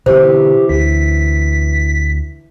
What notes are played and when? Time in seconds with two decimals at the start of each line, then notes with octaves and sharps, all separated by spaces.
0.06 B2 D3 E3 G4 C5
0.69 D2 B6